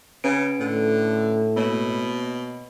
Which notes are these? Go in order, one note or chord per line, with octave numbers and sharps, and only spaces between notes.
C#3 C#4 B4 D7
A2 D3
B2 A#3 C#5